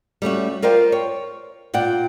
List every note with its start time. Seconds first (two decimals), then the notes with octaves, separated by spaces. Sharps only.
0.22 G3 A3 C#4 F#4
0.62 F4 A#4 C5 D5 G5
0.92 C#5
1.74 A#2 D5 F#5 G5